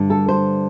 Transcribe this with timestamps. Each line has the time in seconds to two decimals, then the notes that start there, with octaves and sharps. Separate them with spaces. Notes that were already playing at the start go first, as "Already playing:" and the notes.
Already playing: G2 D3 G3
0.10 A4
0.29 C5